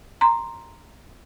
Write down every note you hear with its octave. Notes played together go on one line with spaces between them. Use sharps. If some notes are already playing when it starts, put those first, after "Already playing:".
A#5 C6